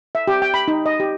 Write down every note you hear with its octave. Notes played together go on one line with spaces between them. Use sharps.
E5
G4
G5
B5
D#4
D#5
G4